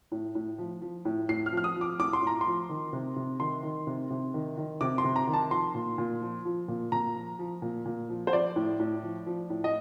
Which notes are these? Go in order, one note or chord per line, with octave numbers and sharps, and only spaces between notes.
A2
A2
F3
F3
A2
A2 C7
F6
F3
F6
D#6
F3
D6
A2 D6
C6
A2 A#5
C6
F3
D#3
C3
C3
D#3 C6
D#3
C3
C3
D#3
D#3
C3 D6
C6
C3
A#5
D#3
A5
F3 C6
A#2
A#2
F3
F3
A#2
A#2 A#5
F3
F3
A#2
A#2
F3
C5
F3 D5
A2
A2
F3
F3
A2
D#5